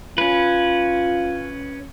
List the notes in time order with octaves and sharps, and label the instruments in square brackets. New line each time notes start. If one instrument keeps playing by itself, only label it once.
[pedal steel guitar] C#4 B4 [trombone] F4